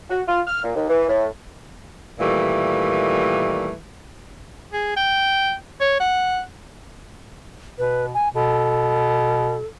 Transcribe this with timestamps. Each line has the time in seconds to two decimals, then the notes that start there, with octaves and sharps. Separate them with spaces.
0.10 F#4
0.28 F4
0.47 F6
0.64 A#2
0.75 D#2
0.89 E3
1.09 A2
2.20 A#2 D#3 E3 G3 A3
4.73 G#4
4.96 G5
5.80 C#5
6.00 F#5
7.78 B2 B4
8.14 G#5
8.35 B2 A4